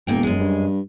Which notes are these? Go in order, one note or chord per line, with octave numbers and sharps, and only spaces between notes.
E1 A#2 A#3 G5
F#2 G#3
G2